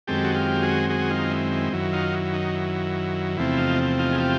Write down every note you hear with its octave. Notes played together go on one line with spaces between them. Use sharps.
F#2 D#3 G#3 C4 G4 A4
F#4
F4 G4
F#4 G#4
F#4 G#4
D#4 F4
E4
E4
F#2 D#3 F#3 E4
D#4 F4
E4
D#4
E4
E2 C3 F3 A3 C4 E4
D#4 F4
D#4 F4
G#4
F4 G4